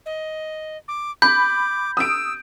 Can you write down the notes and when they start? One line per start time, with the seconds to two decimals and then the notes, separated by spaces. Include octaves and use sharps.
0.06 D#5
0.88 D6
1.22 B5 D6 G6
1.97 D#6 E6 D7